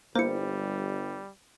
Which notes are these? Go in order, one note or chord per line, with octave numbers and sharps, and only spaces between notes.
G1 G3 A#3 E4 C5 C#7